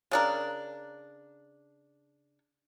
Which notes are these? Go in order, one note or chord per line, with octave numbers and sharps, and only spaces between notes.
C#3 D4 A#4